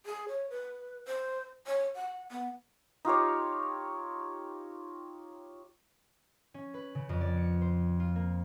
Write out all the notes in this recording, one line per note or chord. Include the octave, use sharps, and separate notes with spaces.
G#4
C#5
B4
C5
C#5
F#5
B3
D#4 F4 G4 C#5
C#4
B4
C#3
F2
D5
C#7
C5
F4
A#3